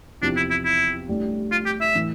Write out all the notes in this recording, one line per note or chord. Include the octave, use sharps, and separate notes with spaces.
E2 C3 F3 D4
E4
E4
E4
A1 A2 G3 D4
F4
G4
E5
A2 E3